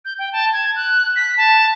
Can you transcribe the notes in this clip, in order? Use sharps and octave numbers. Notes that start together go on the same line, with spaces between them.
G6
G5
A5
G#6
F#6
B6
A5